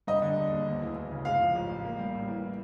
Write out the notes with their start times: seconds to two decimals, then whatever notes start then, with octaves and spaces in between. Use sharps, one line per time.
0.07 G3 D#5
0.22 D3
0.37 E1
0.52 D#2
0.67 D2
0.82 E3
0.95 D2
1.11 C#3
1.25 G#3 F5
1.41 F3
1.56 A1
1.70 A2
1.85 A#3
1.99 G3
2.15 A2
2.28 E3